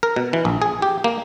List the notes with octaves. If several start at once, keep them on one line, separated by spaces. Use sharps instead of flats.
A#4
B2
E3
A#1
G#4
G4
A#3